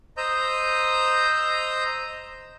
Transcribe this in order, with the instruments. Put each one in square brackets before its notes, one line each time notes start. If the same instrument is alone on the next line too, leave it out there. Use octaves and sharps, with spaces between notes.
[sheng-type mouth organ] C5 D#5 A#5 D#6 E6 G6